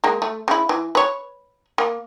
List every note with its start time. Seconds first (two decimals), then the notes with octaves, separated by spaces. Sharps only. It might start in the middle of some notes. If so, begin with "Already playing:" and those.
0.04 G#3 A#3
0.22 A3
0.48 C#3 E4
0.69 E3
0.95 B4 C#5
1.78 A#3